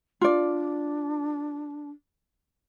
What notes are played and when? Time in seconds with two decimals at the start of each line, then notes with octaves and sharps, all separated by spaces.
0.21 D4 F4 D5